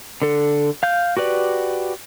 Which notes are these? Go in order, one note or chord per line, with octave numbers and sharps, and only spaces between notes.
D3 A4
F5 G6
F#4 G4 B4 D5